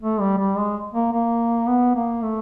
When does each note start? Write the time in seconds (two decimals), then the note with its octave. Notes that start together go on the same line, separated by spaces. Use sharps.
0.02 A3
0.20 G3
0.38 G3
0.57 G#3
0.94 A#3
1.13 A#3
1.68 B3
1.95 A#3
2.23 A3